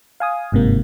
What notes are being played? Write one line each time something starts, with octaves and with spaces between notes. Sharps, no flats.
F5 G#5 D#6
G1 G#2 C3 A#3